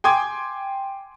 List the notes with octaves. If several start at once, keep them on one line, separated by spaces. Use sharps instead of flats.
G5 G#5 C6 D6 G#6